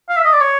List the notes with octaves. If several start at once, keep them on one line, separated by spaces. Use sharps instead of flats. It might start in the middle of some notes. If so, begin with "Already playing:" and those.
F5
E5
D#5
D5
C#5